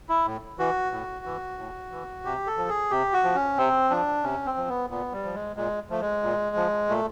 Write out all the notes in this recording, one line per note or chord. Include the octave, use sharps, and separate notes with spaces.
E4
A2
E3 F#4
A2
E3
A2
E3
C3 G4
A4
F3
G#4
C3 G4
F#4
F3
C#4
C3 C4
F3 D4
C3 C#4
C4
F3
B3
A#2 B3
G3
F3
G#3
A#2 G#3
F3 A3
G#3
A#2
F3
A#2 A3